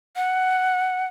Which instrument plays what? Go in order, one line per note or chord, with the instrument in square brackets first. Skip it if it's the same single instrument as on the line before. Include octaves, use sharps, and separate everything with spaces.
[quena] F#5